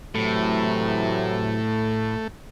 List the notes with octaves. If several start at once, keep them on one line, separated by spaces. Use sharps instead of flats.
A2 C3 E3 F#3 A3